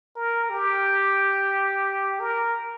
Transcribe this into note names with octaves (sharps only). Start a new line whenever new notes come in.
A#4
G4
A#4